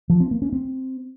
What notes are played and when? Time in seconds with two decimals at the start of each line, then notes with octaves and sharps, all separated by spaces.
0.10 F3
0.20 C4
0.31 A#3
0.42 C#4
0.53 C4